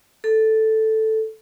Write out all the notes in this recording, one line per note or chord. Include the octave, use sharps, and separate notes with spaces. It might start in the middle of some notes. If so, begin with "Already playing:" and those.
A4